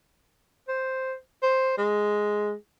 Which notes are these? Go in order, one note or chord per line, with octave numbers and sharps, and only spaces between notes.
C5
C5
G#3